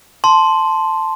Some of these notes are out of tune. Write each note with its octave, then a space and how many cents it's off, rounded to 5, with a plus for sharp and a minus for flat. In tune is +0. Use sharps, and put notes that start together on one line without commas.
A5 +0 C6 +0